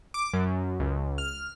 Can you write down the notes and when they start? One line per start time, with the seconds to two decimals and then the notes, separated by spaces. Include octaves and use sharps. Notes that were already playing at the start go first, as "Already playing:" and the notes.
0.14 D6
0.34 F#2
0.79 C#2
1.18 F6